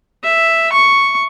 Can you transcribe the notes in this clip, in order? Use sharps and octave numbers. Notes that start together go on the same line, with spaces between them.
E5
C#6